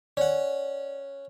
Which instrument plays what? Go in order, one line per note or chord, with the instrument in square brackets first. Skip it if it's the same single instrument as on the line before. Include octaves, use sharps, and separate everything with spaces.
[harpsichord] C#4 F#5 [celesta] D5